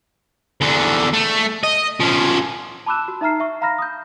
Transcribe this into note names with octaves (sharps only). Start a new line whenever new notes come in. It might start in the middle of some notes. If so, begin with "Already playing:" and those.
E2 D3
A3
D#5
F3 C#4
A5 B5 D6 E6 F#6 E7
F#4
D#4 E5 A#5 F6 C7
E5 C#6
F5 A#5 B5 F6 A#6
D#6 G6